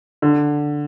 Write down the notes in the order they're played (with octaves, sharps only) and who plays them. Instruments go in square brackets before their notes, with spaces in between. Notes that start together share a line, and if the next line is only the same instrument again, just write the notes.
[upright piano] D3